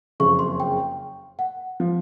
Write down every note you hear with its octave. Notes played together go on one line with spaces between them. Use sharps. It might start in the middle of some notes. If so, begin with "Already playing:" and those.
F#1 F2 C#3 C#6
C6
G5
F#5
F3